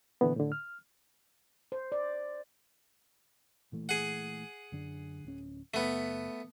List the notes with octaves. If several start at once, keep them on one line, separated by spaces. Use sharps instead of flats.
A#2 D3 E3 B3
A2 D3
F6
C5
D5
A#2 E3 A3
G#4 F#5
F#2 D3 D4
D1 C#4
F#1 A3 B3